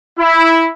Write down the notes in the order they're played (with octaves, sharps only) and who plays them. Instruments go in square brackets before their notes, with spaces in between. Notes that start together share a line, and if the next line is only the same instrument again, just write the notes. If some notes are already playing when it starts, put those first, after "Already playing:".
[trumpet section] E4